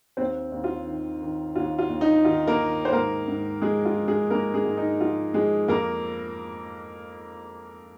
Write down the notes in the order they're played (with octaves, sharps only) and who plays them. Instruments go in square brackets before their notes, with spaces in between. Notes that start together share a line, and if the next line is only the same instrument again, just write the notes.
[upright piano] D#2 C4 C5
D#2
F4
D#3
D#3
D#2 F4
F4
D#2
D#4
D#3 F4
A#3 A#4
D#3
C5
G#2 A#3 A#4
G#2
F3 G#3 G#4
F4
F3
G#3 G#4
G#2 A#3 A#4
G#3 G#4
G#2
D#4
F3 F4
F3 G#3 G#4
F2 A#3 A#4